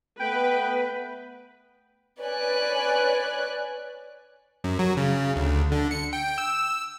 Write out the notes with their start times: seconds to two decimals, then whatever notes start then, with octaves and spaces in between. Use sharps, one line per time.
0.20 A3 B3 B4 G5
2.20 B4 C#5 D5 G#5 F#6
4.64 F#2
4.79 F#3
4.97 C#3
5.36 D2
5.72 D3
5.91 C#7
6.13 G5
6.38 E6